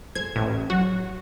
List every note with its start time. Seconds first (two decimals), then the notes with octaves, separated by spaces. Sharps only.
0.15 G#4 A4 C5 G#6
0.36 A1
0.70 F#3 F#4